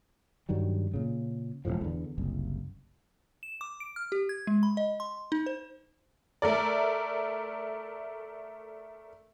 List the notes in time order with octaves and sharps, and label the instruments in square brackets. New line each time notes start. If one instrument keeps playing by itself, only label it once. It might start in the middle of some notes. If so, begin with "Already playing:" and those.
[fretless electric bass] G2 D#3 F#3 G3
A#2 C#3
E1 B1 A2 F3
E2 D3
F#1 C2
[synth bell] E7
D6
D7
F6
G4
G#6
G#3
B5
D#5
C6
D#4
C5
[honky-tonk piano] A3 A#4 D5